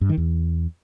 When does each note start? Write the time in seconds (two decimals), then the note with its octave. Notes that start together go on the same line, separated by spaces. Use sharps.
0.01 G2
0.09 D#3
0.18 E2